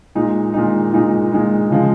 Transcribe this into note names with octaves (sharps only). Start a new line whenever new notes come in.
A#2 G#3 D#4
A#2 G#3 D#4
A#2 G#3 D#4
A#2 G#3 D#4
C#3 F3 G#3